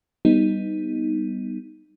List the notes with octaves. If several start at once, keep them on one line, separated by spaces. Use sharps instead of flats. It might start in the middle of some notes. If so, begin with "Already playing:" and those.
G3 B3 D#4